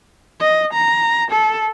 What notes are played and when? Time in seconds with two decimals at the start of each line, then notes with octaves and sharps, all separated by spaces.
0.40 D#5
0.73 A#5
1.31 A4